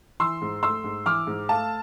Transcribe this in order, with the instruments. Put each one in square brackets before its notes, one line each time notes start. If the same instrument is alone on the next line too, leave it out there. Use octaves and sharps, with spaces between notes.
[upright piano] E3 C6 E6
G#2
A3 C6 E6
G#2
E3 D6 F6
G#2
A3 F5 A5